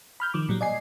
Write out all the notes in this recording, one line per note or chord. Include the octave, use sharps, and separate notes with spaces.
B5 F6 G6
D#3 F3 D6
A#2 F#3 G3
D5 D#5 G#5 C7